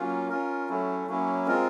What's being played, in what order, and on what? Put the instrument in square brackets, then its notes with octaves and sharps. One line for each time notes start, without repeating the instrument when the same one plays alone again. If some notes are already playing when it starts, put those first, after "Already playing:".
Already playing: [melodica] F#3 A#3 C#4 F4
C#4 F4 A#4
F#3 A3 C#4 E4
F#3 A#3 C#4 E4
G#3 C4 F4 A#4